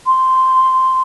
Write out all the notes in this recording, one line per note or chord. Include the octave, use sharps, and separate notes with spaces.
C6